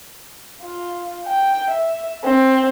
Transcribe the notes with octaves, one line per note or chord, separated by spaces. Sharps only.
F4
G5
E5
C4